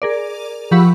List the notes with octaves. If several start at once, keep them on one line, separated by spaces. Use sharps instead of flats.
G#4 A#4 D5
F3 G4 F#5 B5 C#6 E6